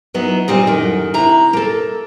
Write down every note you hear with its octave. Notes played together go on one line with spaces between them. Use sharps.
F#3 B3 D#4 E4
A#2 G3 C4 D#5
F#2 A2 D#3
C3 E4 A#5
A#3 A4